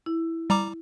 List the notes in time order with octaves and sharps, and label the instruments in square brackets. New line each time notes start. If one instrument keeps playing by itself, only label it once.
[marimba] E4
[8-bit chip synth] G3 A#5 D6